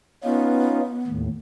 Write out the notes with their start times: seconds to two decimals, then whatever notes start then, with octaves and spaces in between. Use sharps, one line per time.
0.24 B3 C#4 D#4 F4
1.07 D#2 A2